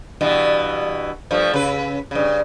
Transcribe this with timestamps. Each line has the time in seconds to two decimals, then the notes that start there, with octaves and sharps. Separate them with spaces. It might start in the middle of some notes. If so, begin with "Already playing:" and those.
0.21 G2 B2 E3
1.31 G2 F3 A3
1.54 C#3 B4
2.11 G2 C#3